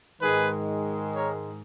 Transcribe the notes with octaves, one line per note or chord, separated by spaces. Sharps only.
G#2 D#3 G#3 G#4 B4
A#4 C#5